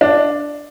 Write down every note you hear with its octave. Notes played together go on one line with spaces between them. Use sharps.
D4